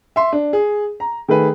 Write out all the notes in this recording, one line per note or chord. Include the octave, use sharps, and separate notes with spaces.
E5 C6
D4
G#4
A#5
D#3 A3 G#4 B4